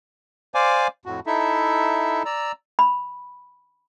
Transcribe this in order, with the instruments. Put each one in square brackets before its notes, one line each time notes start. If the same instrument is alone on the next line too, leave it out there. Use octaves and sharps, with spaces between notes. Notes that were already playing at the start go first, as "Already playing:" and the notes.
[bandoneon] C5 D5 F5 G#5 D6
F2 A2 F#4
D#4 E4 A4 E5
D5 A#5 E6
[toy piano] B5